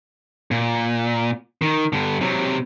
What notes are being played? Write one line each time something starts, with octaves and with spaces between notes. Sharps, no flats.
A#2
D#3
G2 D3
C3 F#3